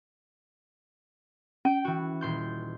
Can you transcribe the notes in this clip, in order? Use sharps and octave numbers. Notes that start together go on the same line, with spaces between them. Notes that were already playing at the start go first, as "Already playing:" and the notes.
C#4 G5
E3 F#4
D#1 C6 G6